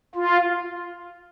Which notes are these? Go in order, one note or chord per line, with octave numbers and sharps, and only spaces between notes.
F4